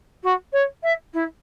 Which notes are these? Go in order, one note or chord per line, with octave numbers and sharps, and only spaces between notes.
F#4
C#5
E5
E4